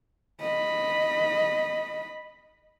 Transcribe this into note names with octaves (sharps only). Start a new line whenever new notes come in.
D#5 B5